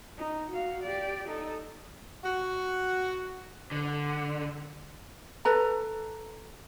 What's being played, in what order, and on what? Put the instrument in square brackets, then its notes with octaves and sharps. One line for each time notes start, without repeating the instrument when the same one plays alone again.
[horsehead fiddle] D#4
F#4 F5
G4 D5
D#4 A4
[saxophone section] F#4
[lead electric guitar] D3
[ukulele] A4 B4 A#5